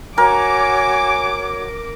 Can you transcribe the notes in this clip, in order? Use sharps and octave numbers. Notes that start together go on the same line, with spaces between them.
F#4 A#4 C#5 G#5 D6